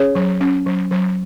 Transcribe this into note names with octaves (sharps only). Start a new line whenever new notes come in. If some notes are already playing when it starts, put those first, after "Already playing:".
Already playing: C#4 G#4 C#5
F#3
C#4
F#3
F#3